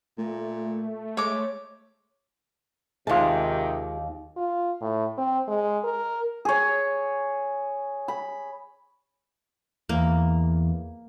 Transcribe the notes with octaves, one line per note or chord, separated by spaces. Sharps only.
A#2 A3
G#3 C#5 D6
D#2 C3 D#3 G#3 F4 A5
F4
A2
C4
G#3
A#4
G#4 C#5
B5
E2 A#3